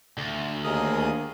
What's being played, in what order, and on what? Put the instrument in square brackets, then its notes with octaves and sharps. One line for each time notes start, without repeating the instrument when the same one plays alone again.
[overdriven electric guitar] D2
[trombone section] D#2 [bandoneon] G#4 A#4 D#6